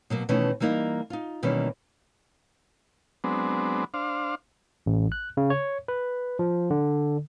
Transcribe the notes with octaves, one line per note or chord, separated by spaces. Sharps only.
B2 F#3 A#3
B2 D#3 E3 A3 C#4
E3 G3 A#3 D#4 D#5
D#4 F4
B2 D#3 E3 G3 A#3 C#4
F#3 G#3 B3 C4 D4
D4 C5 F5
A1
F#6
C#3
C#5
B4
F3
D3